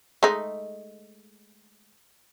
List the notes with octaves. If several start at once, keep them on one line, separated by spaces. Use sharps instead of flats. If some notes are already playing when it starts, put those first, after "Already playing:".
G#3 A3 D#4